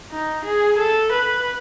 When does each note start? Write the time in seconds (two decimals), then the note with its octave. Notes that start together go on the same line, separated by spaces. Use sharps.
0.12 D#4
0.45 G#4
0.78 A4
1.12 B4